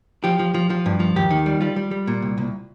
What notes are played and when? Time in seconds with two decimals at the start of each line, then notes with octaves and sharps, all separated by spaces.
0.24 F3 G4
0.39 F3
0.54 F3
0.70 F3
0.86 G2
1.00 F3
1.16 D#2 G4
1.31 D#3
1.46 G3
1.61 G3 F4
1.76 G3
1.91 G3
2.07 A#2
2.22 C2
2.38 C2